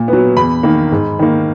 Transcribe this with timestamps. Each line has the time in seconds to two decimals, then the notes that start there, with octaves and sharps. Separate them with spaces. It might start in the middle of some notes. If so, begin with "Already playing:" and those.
Already playing: A#2
0.08 F#3 B3
0.36 E2 B5
0.63 D#3 A#3
0.92 G#2
1.19 D#3 A#3